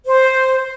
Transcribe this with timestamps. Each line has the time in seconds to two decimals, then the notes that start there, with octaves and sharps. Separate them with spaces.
0.06 C5